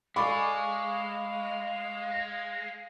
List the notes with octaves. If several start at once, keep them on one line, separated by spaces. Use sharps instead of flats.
G#3 A4 D5 F5 G#5 B5 C#6 D6